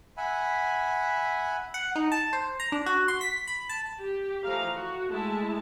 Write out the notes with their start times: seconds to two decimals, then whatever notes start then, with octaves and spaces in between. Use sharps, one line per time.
0.17 E5 F#5 G#5 B5
1.74 F#5
1.95 D#4
2.12 A5
2.33 C5
2.60 A#5
2.72 D4
2.86 F#4
3.08 C6
3.21 B6
3.47 B5
3.69 A5
4.01 G4
4.44 E3 F3 A3 F5 A#5
4.74 F#4
5.09 G#3 A3 E4 A5